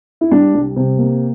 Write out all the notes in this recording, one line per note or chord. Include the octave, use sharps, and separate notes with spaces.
E4
G3 D4
C2
C3
A#3